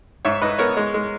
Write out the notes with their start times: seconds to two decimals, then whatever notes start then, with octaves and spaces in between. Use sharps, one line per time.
0.25 G#2 C#5 E5
0.42 G#2 B4 D#5
0.59 B3 A#4 C#5
0.77 G#3
0.94 G#3